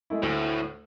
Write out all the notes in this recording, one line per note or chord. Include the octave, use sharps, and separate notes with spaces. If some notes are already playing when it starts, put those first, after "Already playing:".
G#3 A3 E4
D2 A2